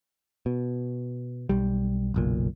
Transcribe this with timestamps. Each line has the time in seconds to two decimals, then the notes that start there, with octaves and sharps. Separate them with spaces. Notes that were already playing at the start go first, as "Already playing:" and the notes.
0.46 B2
1.49 B1 G3
2.14 F#1 B1 A#2